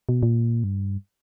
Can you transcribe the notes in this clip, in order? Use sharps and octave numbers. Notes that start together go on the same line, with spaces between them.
B2
A#2
G2